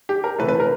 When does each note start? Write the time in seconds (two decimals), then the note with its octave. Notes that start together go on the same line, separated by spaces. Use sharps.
0.09 G4
0.24 A#4
0.38 C3 E3 A3 B4
0.49 B4
0.60 A#4